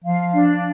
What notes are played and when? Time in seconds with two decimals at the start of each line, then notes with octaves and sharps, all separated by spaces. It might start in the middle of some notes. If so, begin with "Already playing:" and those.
0.04 F3 F5
0.33 D4